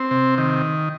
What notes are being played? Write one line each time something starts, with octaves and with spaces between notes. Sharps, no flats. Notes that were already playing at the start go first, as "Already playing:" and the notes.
Already playing: C4
C3
D#3